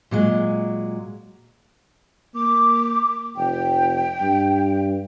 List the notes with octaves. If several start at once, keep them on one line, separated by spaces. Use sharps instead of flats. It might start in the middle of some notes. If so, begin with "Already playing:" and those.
A#2 F#3 G#3
A#3 D6
F1 G5
G2